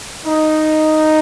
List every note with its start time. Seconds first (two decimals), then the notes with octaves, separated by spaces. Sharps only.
0.24 D#4